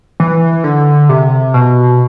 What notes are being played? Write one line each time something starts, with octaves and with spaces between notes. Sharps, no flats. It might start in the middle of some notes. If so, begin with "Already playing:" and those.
E3
D3
C3
B2